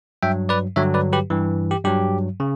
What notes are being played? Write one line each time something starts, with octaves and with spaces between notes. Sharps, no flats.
G2 F#3 E5 G5
B4 D5
G2 D3 F#3 C#5 E5
B4 D5
G4 B4
G2 E3
G4
G2 F#3 G4
C#3